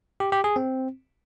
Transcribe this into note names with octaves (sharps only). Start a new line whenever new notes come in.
G4
G4
G#4
C4